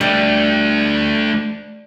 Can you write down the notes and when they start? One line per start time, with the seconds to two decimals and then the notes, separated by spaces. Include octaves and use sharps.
0.01 G3 A3 D4